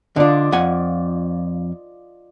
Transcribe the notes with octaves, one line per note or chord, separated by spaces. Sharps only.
D3 D4 F4 D5 D#5
F2 F#5 G#5